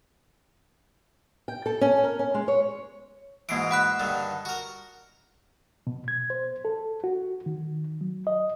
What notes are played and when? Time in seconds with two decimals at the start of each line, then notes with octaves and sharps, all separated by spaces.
1.48 G5
1.66 A4
1.81 C#4
2.04 A#4
2.19 C#4
2.34 G#3
2.48 C#5
3.49 G#2 B2 E3 A#3 C7 D7
3.71 F#5 B5 F#6
4.00 G2 D3 D#3
4.45 F#4 A#4
5.87 B2
6.08 G#6
6.30 C5
6.65 A4
7.04 F#4
7.46 D#3
8.01 F#3
8.27 D#5